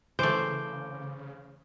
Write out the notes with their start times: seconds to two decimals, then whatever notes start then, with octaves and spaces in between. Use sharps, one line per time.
0.19 C#3 E3 A3 C5 D6 G6